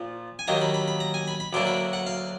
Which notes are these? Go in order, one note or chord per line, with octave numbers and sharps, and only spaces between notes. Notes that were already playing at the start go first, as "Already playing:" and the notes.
Already playing: A#2 F3
G#5
D#2 D#3 F#3 A#3 A#5
B5
B5
B5
A#5
G#5
B5
B5
D2 D3 F#3 A#3 D4 D6
B5
F#5
F5